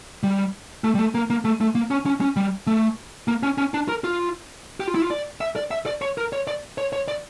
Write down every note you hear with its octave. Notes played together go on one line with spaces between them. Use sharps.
G3
A3
G3
A3
A#3
A#3
A3
A3
A#3
C#4
C#4
C#4
G3
A3
A#3
C#4
C#4
D4
A#4
F4
G4
F4
E4
F4
D5
E5
D5
E5
D5
C#5
A#4
C#5
D5
C#5
C#5
D5